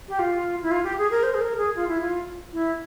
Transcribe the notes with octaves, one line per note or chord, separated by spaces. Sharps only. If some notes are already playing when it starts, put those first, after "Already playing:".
G4
F4
E4
F4
G4
G#4
A#4
C5
G#4
A#4
G#4
F4
E4
F4
E4